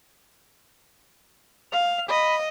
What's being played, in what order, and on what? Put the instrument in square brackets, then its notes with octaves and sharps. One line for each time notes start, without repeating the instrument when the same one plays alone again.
[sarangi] F5 [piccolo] F7
[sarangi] D#5 [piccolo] B5